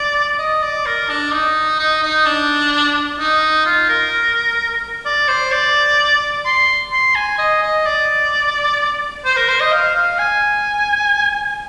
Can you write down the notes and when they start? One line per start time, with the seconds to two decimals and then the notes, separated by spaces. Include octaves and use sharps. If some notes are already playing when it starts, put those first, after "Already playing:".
Already playing: D5
0.39 D#5
0.62 D5
0.86 A#4
1.09 D4
1.32 D#4
1.79 D#4
2.03 D#4
2.26 D4
3.19 D#4
3.65 F4
3.89 A#4
5.05 D5
5.28 C5
5.52 D5
6.45 C6
6.92 C6
7.15 G#5
7.38 D#5
7.62 D#5
7.86 D5
9.25 C5
9.37 A#4
9.48 C5
9.60 D#5
9.72 F5
9.95 F5
10.19 G#5